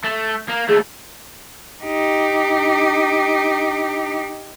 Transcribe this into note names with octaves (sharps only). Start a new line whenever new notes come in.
A3
A#3
D#2 A3 G#4
D#4 G4